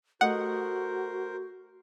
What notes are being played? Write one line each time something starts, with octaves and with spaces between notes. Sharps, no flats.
A3 F#4 G4 A#4 C5 D#5 F#5